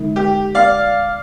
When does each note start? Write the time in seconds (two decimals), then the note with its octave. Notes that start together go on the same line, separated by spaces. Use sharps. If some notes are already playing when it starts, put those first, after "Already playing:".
Already playing: D3 G#3 D#4
0.16 G4
0.55 D5 F5